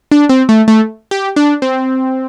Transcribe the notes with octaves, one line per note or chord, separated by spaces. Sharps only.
D4
C4
A3
A3
G4
D4
C4